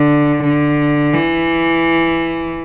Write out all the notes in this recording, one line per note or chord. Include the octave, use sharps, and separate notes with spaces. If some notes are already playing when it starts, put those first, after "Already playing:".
Already playing: D3
D3
E3